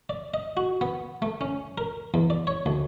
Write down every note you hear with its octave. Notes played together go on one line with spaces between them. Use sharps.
D5
D#5
F#4
B3
A3
C#4
A#4
E2
D5
C#5
D2